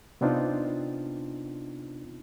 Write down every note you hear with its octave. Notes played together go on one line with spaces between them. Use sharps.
C3 B3 C4 D4 D#4 F4